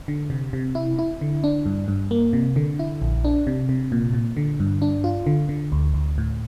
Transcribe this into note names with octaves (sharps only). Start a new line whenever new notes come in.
D3
C3
C3
E4
E4
D3
D4
G2
G2
A#3
C3
D3
E4
A#1
D4
C3
C3
A#2
A#2
D3
G2
D4
F4
D3
D3
D2
D2
A2